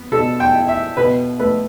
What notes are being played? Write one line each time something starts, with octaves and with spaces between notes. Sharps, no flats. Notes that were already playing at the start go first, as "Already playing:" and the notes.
Already playing: B3
B2 A4
G5
E4
E5
B2 B4
A3 B4